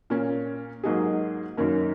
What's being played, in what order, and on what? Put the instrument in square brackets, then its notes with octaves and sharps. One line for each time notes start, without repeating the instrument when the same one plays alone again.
[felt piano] A#2 A#3 C#4
G#2 F#3 A#3 D#4 G#4
F#2 D#3 A#3 C#4 A#4